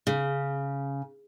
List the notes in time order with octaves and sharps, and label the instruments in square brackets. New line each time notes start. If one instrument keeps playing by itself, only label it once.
[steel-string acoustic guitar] C#3